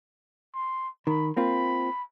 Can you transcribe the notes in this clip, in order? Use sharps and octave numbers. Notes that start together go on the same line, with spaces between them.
C6
D#3 B5
A#3 C4 F4 B5